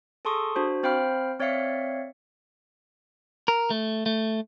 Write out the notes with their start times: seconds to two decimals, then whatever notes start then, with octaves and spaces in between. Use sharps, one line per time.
0.25 G#4 A4 A5 C6 C#6 D#6
0.56 D4 F#4 C5
0.83 C4 C5 F5 G5 B5 F6
1.40 C4 C#5 D5 E5 F5 C#7
3.48 A#4
3.70 A3
4.06 A3